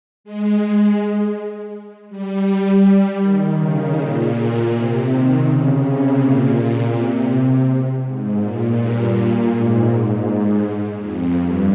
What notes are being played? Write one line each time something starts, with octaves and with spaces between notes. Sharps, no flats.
G#3
G#3
G3
G3
D#3
C#3
A#2
C3
D#3
C#3
C3
A#2
C3
G#2
A#2
G2
A#2
G#2
G#2
F2
G2